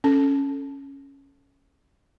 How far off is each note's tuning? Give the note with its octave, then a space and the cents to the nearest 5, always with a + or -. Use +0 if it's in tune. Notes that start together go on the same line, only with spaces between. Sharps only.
C#4 -5 A4 +0